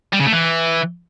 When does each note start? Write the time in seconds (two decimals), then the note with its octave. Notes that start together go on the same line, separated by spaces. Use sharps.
0.13 G3
0.20 C#3
0.26 A3
0.33 E3